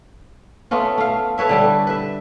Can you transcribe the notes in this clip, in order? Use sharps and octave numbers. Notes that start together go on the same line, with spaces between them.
A3 B3 C#4 F4
A3 F5
A4 B4 C#5 E5
D3 G3 A4
B4 E5